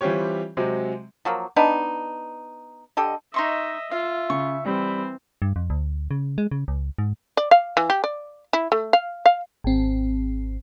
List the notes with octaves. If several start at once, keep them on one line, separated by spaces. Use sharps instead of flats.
E3 G3 C4 F4 G4 C#5
C3 F#3 G#3 C4
F3 F#3 A#3
B3 D4 D#4
D3 G4 A4 D#5
D#4 D#5 E5 C6 C#6
F4 E5 F5
C#3 C#6
E3 G3 C4 B5
G2
F2
D2
C#3
G#3
C#3
C#2
G#2
D5
F5
E3
G4
D5
E4
A3
F5
F5
G#1 C4